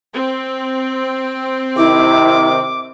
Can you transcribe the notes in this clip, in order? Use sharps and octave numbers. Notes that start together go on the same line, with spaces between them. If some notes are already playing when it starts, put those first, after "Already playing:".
C4
C3 D#3 E4 D6